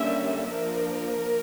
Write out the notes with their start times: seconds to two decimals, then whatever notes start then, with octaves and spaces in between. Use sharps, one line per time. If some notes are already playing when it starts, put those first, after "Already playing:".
Already playing: D3 G3 A#3 C#4 E5
0.51 F3 A#3 D4 A#4